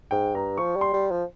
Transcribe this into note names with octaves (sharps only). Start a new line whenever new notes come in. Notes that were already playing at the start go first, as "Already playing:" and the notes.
G#2 G5
G2 A#5
F3 C#6
G3
C6
G3
F3